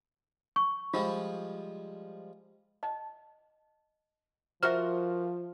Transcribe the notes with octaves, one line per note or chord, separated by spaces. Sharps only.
C#6
F3 G3 G#3 F4
D#5 A5
F3 F4 F#4 A#4 C5 E5 F6